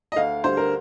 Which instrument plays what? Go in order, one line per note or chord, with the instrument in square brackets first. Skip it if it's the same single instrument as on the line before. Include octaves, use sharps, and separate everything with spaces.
[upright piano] D#5
D2 F5
D3 G3 C5
A#4